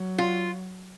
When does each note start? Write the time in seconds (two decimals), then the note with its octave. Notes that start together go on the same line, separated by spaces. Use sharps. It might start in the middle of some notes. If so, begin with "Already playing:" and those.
Already playing: F#3
0.18 F4